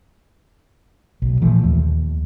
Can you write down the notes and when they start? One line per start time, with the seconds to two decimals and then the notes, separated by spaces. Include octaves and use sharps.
1.22 B1
1.42 A#2 E3 F3 A3
1.64 D#2